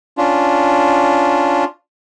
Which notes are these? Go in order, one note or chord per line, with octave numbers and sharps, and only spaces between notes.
C#4 D4 F4